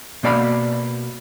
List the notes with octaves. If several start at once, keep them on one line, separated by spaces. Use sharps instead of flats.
B2 A#3 D5 F5 B5